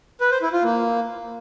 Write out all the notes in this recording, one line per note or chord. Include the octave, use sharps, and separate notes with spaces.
B4
C5
E4
F4
A#3